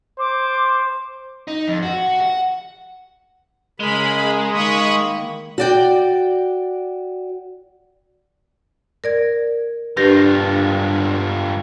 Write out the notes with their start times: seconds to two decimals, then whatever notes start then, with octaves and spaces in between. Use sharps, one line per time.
0.19 C5 D6
1.48 D#4
1.68 F2
1.83 F#4
2.21 F#5
3.80 C#3 G#3 G#4 A#4 B5
4.53 D#3 A#3 B5 C#6 D#6
5.58 F#4 D5 G5
9.04 A#4 D5 G#6
9.97 G2 D4 F4 G4 A#4 B4 A#6